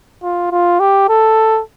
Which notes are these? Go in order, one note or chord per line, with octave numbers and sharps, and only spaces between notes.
F4
F4
G4
A4